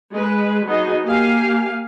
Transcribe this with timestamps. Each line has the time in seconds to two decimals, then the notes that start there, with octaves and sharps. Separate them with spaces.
0.12 G#3 B4
0.65 F#3 B3 D#4 G#4 D#5
1.04 A#3 G4 F5 G#5